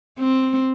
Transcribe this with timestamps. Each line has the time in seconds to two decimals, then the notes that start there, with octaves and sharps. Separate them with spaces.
0.19 C4